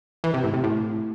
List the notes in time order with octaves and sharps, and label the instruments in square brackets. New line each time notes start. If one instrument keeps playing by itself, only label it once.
[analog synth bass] E3
C3
A2
C3
A2